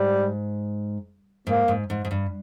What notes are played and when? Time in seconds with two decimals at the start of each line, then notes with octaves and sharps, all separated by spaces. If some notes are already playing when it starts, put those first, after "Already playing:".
Already playing: G#2 G3
1.47 G#2 A#3
1.68 G#2
1.90 G#2
2.05 G#2
2.11 G2